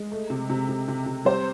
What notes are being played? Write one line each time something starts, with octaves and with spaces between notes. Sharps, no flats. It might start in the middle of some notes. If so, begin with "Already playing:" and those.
Already playing: G#3
A3
C3
C3
C3
C3
C3
G3 C5